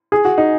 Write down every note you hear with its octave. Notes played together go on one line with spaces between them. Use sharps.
G#4
F#4
D#4